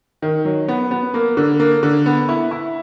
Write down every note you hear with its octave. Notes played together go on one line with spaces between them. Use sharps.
D#3
F#3
B3
B3
A#3
D3
A#3
D3
B3
E4
E4